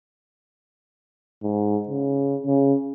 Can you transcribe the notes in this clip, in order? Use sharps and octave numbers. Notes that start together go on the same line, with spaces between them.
G#2
C#3
C#3